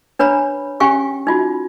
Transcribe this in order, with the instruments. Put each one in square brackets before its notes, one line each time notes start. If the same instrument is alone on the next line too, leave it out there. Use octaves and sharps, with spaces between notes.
[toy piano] D4 B4 C#5 A#5 B5
C#4 G4 F5 G5 G#5 C#6
D#4 F4 F#4